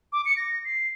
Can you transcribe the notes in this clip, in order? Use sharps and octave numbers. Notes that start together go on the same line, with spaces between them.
D6
C#7
A#6
C7